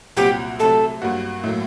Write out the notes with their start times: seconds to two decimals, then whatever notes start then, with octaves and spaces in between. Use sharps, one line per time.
0.17 C2 A#2 F#3 C4 F#4 G4
0.59 C3 F#3 A3 A4
1.02 G2 F#3 A#3 F#4
1.44 A2 F#3 A#3